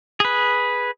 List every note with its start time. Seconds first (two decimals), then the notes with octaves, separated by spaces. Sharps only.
0.20 G#4 B4